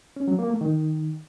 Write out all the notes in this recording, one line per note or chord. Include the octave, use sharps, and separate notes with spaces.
C#4
F#3
A#3
A3
D#3